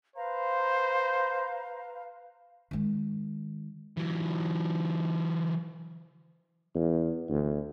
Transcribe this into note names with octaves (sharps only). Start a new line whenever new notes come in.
B4 C5 F5 A#5
D#3 G#3
E3 F#3
E2
D2